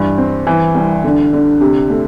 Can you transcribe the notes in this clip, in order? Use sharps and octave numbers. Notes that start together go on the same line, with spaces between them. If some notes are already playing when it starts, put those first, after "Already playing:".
Already playing: G2 E3
C4
E3
C2
D3
D3
C3
A3